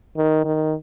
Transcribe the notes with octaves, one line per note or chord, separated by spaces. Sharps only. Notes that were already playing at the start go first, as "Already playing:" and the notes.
D#3
D#3